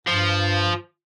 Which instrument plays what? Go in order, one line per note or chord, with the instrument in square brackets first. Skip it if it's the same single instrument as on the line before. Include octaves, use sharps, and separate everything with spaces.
[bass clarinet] G2 [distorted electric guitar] F3